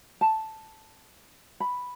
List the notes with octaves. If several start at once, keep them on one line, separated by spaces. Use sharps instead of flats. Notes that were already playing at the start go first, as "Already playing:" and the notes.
A5
B5